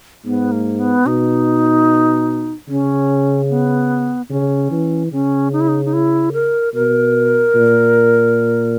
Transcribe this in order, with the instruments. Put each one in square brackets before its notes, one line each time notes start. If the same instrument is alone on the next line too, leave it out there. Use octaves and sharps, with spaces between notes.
[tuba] G#2 [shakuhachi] B3
[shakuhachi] A#3
B3
[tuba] B2 [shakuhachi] D#4
[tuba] C#3 [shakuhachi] C#4
[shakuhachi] B3
[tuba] C#3 [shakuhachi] C#4
[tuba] E3
[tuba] C#3 [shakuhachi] C#4
[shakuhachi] D#4
E4
D#4
D#4
E4
A#4
[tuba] B2 [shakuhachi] A#4
[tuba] A#2